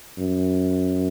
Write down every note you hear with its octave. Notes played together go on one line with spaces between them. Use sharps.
F#2